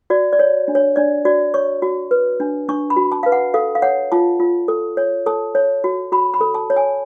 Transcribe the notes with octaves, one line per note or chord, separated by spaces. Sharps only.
F#4 D5
D5
C#5
D4
C#5
D4 D5
F#4 D5
C#5 C#6
F#4
B4
D4
D4 C#6
B5
F#4
A5
B4 F5
F#5
A4 F5
F5
C#5 F#5
F4 A5
F4
A4
C#5
A4 A5
C#5
F#4
F#4 B5
B5
A4
A5
C#5
G#5